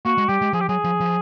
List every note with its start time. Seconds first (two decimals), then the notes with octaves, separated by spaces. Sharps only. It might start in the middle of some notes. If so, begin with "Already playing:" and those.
0.05 A#3 F#4
0.18 G#3
0.29 G3 G4
0.42 G#3
0.53 F3 G#4
0.60 G4
0.69 F#3 G#4
0.84 F3
1.00 F3